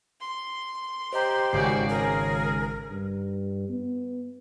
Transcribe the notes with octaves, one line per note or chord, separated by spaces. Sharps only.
C6
G4 C5 D#5 A#5
G#1 C#3 F#4 D5 G#5 C7
G#4 A#4
G2
B3